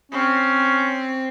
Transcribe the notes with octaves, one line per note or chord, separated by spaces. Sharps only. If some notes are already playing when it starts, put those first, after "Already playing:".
C4 C#4